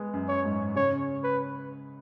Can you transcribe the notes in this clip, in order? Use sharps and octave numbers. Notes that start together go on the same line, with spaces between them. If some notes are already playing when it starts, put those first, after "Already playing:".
Already playing: G#3 B3
F#2
C#5
G#2
C#3 C#5
B4